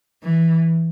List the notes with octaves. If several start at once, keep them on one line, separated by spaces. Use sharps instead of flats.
E3